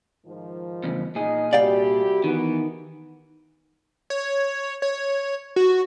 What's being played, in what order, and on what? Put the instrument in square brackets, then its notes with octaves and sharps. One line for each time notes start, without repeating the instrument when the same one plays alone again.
[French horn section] G#2 D#3 F3
[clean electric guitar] E2 G2 C#3
[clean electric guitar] A#2 G#4 [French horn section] D#4 D#5
[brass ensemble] C2 E4 G4 [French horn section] F#4 [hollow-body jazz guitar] D5 F5 G5
[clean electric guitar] D#3 [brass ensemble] E3 B3
[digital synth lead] C#5
C#5
F#4